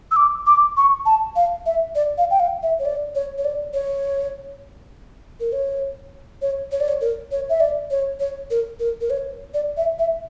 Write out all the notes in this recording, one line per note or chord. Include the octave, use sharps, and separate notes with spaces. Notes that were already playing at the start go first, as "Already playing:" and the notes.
E6
D6
D6
C#6
A5
F5
E5
D5
F5
G5
F5
E5
C#5
D5
C#5
C#5
D5
C#5
A#4
C#5
C#5
C#5
D5
C#5
A#4
C#5
E5
D5
C#5
C#5
A#4
A#4
A#4
C#5
D5
E5
E5